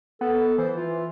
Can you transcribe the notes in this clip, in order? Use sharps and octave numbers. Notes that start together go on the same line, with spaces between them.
B3 A4
E3 C5
F4